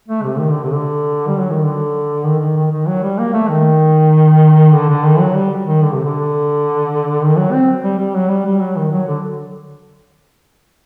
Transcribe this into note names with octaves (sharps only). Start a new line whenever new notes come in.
A3
C3
D#3
D3
C3
D3
G3
F#3
D#3
D3
D#3
D#3
D#3
D#3
F#3
G3
A#3
A3
D#3
D3
D3
D#3
F#3
G3
D#3
D3
C3
D3
D#3
F#3
C4
G3
G3
F#3
G3
G3
F#3
D#3
F#3
D3